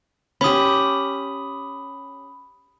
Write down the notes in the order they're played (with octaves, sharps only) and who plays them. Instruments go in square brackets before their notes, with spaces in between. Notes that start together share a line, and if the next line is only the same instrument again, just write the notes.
[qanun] C#4 G4 [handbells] B5 D#6